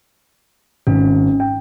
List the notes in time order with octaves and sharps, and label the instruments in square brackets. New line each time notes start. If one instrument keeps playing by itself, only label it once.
[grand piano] G#1 [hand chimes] C#4
[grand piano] G5